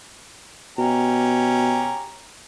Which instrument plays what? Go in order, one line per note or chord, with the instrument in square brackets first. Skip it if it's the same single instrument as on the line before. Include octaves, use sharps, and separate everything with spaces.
[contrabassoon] B2 [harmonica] C#4 G4 A#5